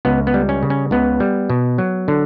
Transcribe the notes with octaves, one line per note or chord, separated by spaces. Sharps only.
C#2 B3
B3
G3
C#4
C#3
C#4
C#2 B3
G3
B2
F#3
D3